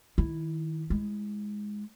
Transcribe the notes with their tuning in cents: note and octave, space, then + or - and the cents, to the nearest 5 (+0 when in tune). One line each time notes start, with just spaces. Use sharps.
D#3 +15 E4 +0
G#3 +0 E4 +5